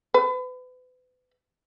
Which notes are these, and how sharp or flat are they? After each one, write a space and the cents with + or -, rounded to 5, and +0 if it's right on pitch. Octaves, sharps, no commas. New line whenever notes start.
B4 +35